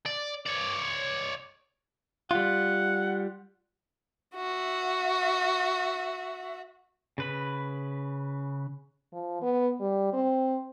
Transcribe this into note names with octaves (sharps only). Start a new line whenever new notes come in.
D5
C#5 D5
G3 F4 F#5
F#4 E5
C#3 B4 B5
F3
B3
G3
C4